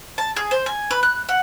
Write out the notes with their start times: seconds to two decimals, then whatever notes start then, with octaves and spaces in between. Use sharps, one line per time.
0.18 A5
0.36 G#4
0.51 C5
0.66 G#5
0.91 B4
1.03 F#6
1.29 F#5